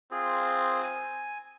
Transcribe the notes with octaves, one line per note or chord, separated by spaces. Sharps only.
C4 F4 G#4
G#5